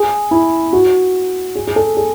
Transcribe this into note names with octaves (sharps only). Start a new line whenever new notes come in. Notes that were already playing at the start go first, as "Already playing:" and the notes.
Already playing: G#4
E4
F#4
G#4
G#4
A4
G#4